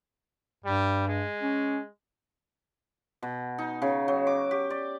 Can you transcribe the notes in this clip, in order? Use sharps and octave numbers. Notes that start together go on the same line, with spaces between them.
G2 G3
G#3
C#4
B2
D#4
C#3
F#3
D6
G4
D5